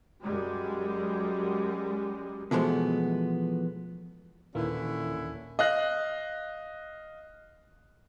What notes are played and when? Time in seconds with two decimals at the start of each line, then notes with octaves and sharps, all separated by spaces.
0.22 F#2 G3 G#3
2.51 B2 E3 F3 G#3 A3 B3
4.55 D#2 A#2 D3 E3 A#3 C#4 E4
5.59 D#5 F5 F#6